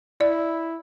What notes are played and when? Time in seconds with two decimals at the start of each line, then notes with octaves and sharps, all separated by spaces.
0.21 E4 D5